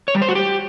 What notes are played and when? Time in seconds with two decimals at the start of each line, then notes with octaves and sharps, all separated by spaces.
0.08 C#5
0.15 G3
0.22 C5
0.28 F#4
0.35 G4